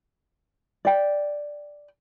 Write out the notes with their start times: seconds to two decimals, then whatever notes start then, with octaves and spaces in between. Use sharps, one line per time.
0.85 D5 G5